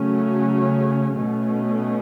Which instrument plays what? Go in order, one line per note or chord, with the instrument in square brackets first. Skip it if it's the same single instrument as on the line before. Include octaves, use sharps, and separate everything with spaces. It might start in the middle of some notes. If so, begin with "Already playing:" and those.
Already playing: [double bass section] C#3 F#3 A3 C#4
B2 A3 C#4